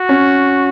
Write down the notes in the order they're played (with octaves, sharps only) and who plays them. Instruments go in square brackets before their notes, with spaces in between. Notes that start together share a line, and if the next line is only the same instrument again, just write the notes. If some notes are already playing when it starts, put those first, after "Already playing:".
Already playing: [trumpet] F#4
[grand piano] C#4